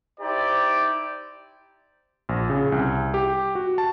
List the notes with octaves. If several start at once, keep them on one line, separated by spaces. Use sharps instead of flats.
D#4 E4 G4 C5 D5
A#1
C#3
C2
G4
F#4
A5